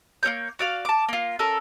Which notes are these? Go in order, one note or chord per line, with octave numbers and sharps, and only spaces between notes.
A#3 C#4 C#5 G6
F#4 D5 F5
A5 D6
A#3 F4
C#4 A4 A#4